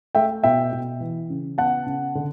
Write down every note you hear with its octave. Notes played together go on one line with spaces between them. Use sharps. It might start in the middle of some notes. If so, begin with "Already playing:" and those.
A3 E5 G5
B2 E5 G5
B2
E3
C#3
B3 F#5 A5
C#3
D3